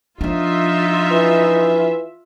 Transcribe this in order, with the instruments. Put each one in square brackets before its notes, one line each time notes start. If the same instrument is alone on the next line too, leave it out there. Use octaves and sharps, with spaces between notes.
[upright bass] F3 D4 [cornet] D#4 [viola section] F4 E5
[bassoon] E3